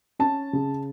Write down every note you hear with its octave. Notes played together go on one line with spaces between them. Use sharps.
C#4 A5
C#3